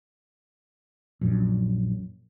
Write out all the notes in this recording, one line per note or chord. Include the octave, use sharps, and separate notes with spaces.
A#1 F#2